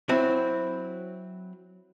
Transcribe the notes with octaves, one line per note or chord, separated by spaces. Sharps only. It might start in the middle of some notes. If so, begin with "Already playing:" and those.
F#3 C4 E4